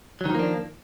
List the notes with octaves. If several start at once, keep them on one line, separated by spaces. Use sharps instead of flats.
D#3 F3 F#3 A#3 D4